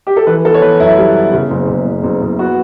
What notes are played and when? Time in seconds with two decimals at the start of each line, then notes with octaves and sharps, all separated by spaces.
0.07 G4
0.17 A4
0.27 E3 B4
0.45 B3 A4
0.54 C#5
0.62 E3 B4
0.80 F#2 E4
0.97 G3
1.15 B3
1.33 C#3
1.50 F#1
1.68 F#1
1.85 F#1
2.03 F#1
2.21 F#1
2.39 B3 F#4